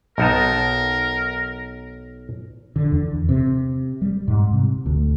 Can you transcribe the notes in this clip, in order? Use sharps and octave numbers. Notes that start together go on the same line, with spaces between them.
B1 D#4 A#4 A5
D3
E2
C3
G3
G#2
C3
D2